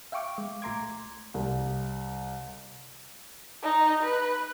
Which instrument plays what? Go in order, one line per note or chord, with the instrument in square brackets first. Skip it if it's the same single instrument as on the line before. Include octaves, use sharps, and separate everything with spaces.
[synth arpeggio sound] E5 F5 G5 C#6 D6
G#3
A#1 A3 A#5 C6 D6 G#6
[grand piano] C2
[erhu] D#4
B4